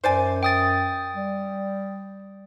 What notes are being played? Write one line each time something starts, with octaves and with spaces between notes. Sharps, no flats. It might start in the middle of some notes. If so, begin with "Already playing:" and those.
F#2 C5 D5 G#5
G5 D#6 A6
G3